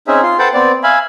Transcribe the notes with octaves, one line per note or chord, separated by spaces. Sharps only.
C4 C#4 D#4 G#4 E5
F4 C6
A4 B4 C5 F#5 G5 A5
B3 C4 D5
E5 F5 G#5 B5